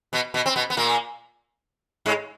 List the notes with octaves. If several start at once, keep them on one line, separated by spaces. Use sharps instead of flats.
B2 B3
B2 B3
C4
B2 B3
B3
A#2 A#3
G#2 G#3